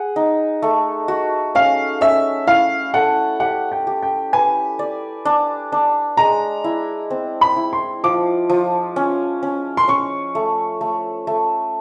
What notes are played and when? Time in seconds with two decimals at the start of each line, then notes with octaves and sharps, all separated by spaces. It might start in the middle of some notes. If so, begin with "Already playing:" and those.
Already playing: G#4 F#5
0.16 D#4
0.62 A3
1.08 F#4
1.55 C#4 F5
2.01 C#4 E5
2.47 E4 F5
2.94 A4 F#5
3.40 G4 F#5
3.72 G5
3.87 G4
4.03 G5
4.33 B4 G#5
4.79 D5
5.25 D4
5.72 D4
6.17 G#3 A#5
6.64 E4
7.10 C4
7.41 B5
7.57 E4
7.73 C6
8.04 F3 D6
8.50 F3
8.96 C#4
9.43 C#4
9.77 C6
9.88 C#4 C#6
10.35 A3
10.81 A3
11.27 A3